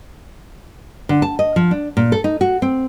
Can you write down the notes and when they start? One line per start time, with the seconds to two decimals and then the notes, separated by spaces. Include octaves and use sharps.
1.09 D3
1.22 A5
1.39 D#5
1.56 F3
1.71 D4
1.97 A#2
2.12 A4
2.24 D#4
2.41 F#4
2.62 C4